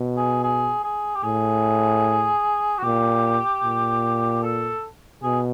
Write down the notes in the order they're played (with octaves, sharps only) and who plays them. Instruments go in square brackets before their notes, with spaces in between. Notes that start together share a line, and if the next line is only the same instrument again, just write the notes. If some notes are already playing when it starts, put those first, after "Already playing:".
Already playing: [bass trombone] B2
[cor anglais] G#4
G#4
G#4
G4
[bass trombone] A2 [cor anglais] G#4
[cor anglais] F#4
[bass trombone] A#2 [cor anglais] G4
[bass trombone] A#2
[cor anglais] A4
[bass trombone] B2 [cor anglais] G#4